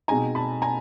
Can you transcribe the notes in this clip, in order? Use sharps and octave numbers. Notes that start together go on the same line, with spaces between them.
B2 G#3 C4 D#4 G#5 A#5
A5 B5
G#5 A#5